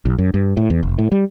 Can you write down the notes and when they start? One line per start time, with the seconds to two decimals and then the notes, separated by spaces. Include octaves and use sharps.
0.05 B1
0.18 F#2
0.34 G2
0.57 A2
0.70 E2
0.83 F1
0.98 A2
1.12 G3